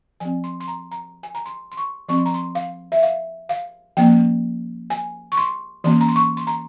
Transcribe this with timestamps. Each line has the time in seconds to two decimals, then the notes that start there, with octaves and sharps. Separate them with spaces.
0.20 F3 C4 G#5
0.44 C6
0.60 C6
0.68 A#5
0.91 A#5
1.23 G#5
1.35 A#5
1.46 C6
1.72 C6
1.77 C#6
2.08 F3 C4 C#6
2.17 C6
2.26 A#5
2.34 C6
2.55 F5
2.92 E5
3.03 F5
3.49 F5
3.97 F3 A#3 C#4 G5
4.90 G#5
5.32 C#6
5.37 C6
5.84 E3 A#3 C#4 C6
6.01 A#5
6.09 C6
6.16 C#6
6.37 C6
6.47 A#5